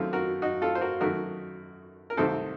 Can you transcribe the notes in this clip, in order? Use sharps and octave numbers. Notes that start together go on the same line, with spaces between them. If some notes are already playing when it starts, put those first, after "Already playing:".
Already playing: F#2 D#3 A3 C4 F4 A4
F#4 A#4
D#4 F#4
F4 A4
C5
F#4 A#4
F#2 D#3 A3 F#4 A#4
A#4
C2 C3 D#3 A3 C4 A4 C5